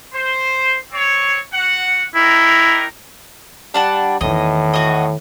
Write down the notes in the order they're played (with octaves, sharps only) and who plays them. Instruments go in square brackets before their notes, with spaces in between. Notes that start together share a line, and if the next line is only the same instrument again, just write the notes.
[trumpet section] C5
C4 C#5
F#4 F#5
[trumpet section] D#4 G4 A#4 [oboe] E4
[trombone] G3 [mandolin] D4 F#5 A5
[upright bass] E2 D#3 [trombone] A2 [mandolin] D#5
[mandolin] F#4 D#5